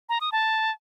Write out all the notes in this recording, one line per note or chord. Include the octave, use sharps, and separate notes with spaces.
A#5
D#6
A5